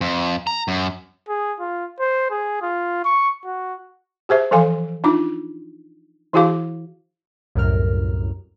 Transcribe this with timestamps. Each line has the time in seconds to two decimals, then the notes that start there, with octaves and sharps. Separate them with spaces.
0.01 F2
0.47 A#5
0.68 F#2
1.28 G#4
1.60 F4
2.00 C5
2.31 G#4
2.62 F4
3.05 C#6
3.45 F#4
4.29 G4 G#4 C5 E5
4.51 E3 F3 A4 F5 G#5 C6
5.04 D4 D#4 F4 D6
6.33 E3 E4 F#4 G#4 F5 D6
7.55 C2 F#2 A2 A#4 F6